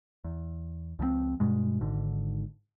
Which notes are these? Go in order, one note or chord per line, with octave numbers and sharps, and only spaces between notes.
E2
C#2 F3 G3 C4
G2 B2 G#3
G#1 G#2 D3